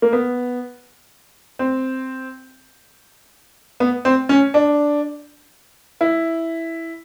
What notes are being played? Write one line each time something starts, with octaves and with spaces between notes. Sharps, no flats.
A#3
B3
C4
B3
C4
C#4
D4
E4